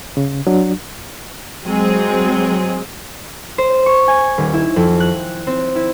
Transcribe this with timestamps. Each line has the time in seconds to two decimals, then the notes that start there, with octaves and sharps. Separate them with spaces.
0.17 C#3
0.47 F#3 D4
1.65 F#3 G#3 C4 G#4
3.58 C5
3.86 C#6
4.08 G#5
4.38 D#1
4.54 E4
4.76 F2
5.00 F#6
5.47 C4
5.76 E4